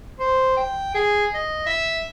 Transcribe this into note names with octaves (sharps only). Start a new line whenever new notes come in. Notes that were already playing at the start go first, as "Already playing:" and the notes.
C5
G5
G#4
D#5
E5